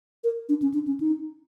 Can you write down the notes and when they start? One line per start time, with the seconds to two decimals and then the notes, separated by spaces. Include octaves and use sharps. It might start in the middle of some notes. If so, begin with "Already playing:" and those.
0.24 A#4
0.49 D4
0.62 C#4
0.74 D4
0.87 C#4
1.00 D#4